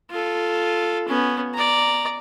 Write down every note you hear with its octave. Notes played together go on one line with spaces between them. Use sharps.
F4 A4
B3 C#4
D5 A#5